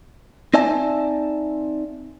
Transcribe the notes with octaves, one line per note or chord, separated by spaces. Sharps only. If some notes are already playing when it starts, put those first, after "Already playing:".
C4 D#4 D5 E5 G#5 A5